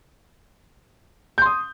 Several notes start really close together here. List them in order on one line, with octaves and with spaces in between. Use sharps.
G6 C6 D#6